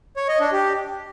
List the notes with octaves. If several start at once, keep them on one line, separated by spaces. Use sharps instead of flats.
C#5
D#5
D4
G4